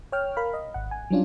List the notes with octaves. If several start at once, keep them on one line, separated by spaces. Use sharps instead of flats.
C#5 G5 F6
A#4 F5 B5
D#5
G#1 F#5
G#5
F#3 G3 C#4 D4 F4